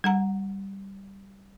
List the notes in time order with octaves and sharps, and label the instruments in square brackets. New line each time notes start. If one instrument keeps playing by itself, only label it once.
[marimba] G3 F#5 A#5